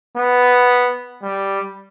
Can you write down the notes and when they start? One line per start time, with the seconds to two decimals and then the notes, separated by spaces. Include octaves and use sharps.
0.17 B3
1.23 G3